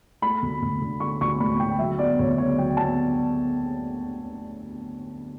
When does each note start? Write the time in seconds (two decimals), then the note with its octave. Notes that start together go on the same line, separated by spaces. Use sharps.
0.22 A3 B5
0.42 D2
0.62 D2
0.82 D3
1.00 A3 C#6
1.21 D2 C#6
1.40 D2 B5
1.60 D3 G5
1.79 F#3 E5
1.99 B3 D5
2.19 D2 C#5
2.38 C#3 C#5
2.58 F#3 G5
2.77 B3 A5